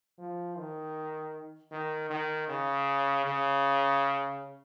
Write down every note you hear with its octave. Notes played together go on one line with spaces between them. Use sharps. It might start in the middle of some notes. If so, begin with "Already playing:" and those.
F3
D#3
D#3
D#3
C#3
C#3